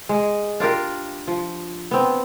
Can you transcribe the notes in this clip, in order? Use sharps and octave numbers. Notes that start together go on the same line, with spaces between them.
G#3
D4 F4 G4 A#4
F3
B3 C4